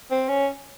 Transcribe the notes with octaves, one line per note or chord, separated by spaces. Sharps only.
C4
C#4